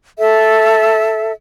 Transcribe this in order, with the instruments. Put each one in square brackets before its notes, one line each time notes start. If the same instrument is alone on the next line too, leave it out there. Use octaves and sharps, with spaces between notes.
[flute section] A4 E5